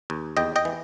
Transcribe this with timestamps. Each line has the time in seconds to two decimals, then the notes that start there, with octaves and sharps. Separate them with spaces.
0.10 D#2
0.37 E2 D#5 G5
0.56 D#5 G5
0.65 E3